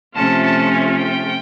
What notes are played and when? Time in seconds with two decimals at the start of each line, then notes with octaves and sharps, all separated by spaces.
0.15 C3 F3 A3 C#4 F4 A5
0.43 A5
0.71 G#5
0.99 G5